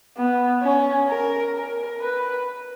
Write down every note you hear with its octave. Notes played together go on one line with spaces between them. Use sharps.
B3
C#4
A#4
A#4
B4